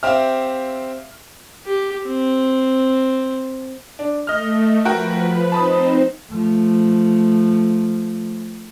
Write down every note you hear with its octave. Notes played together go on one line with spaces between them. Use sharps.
C4 G4 E5 F5 F6
G4
C4
D4
A3 D#5 F6
F3 F#4 A#4 B4 G5
C4 D#4 C5 A5 B5 D#6
F3 A3